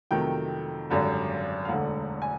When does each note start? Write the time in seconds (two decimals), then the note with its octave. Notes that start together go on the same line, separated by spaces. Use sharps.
0.11 F2 C3 D#3 F#3 A3 G5
0.90 G#1 F#2 D3 G3
1.65 F5
1.69 E1 D2 D3 F#5
2.22 G#5